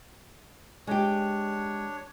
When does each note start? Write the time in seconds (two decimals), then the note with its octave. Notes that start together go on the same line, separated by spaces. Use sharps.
0.87 G#3 D4 G4 C#5